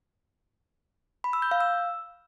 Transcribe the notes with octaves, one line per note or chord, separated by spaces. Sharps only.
B5
E6
G6
F5
E6